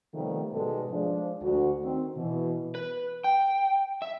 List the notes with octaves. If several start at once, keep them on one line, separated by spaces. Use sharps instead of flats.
C3 D#3 F3 G3 A3 B3
G#2 B2 G3 G#3 A4 B4
F3 G#3 D4
D2 F#4
D#3 C4
B2 E3
B4
G5
E5